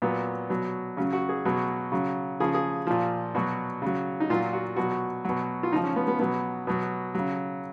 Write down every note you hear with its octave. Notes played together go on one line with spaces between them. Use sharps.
A#2 F#3 B3
B2 F#3
C#3 F#3 C#4
F#4
G#4
B2 F#3
C#3 F#3
C#3 F3 G#4
G#4
A#2 F3
B2 F#3 F#4
C#3 F#3
D#4
A#2 F#3 F4
F#4
B2 F#3 F#4
B2 F#3
F4
C#3 F3 D#4
C#4
B3
B3
B2 F#3 B3
B2 F#3
C#3 F#3